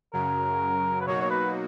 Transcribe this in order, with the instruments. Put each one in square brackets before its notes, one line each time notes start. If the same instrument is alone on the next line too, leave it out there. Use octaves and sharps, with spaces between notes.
[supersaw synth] F#2 C#3 F#3 [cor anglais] A#4
[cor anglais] B4
[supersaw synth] B2 F#3 A#3 D#4 F#4 [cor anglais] C#5
[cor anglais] C#5
B4